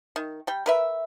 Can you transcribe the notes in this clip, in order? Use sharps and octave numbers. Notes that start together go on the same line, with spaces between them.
D#3
G3 G5
A#4 B4 E5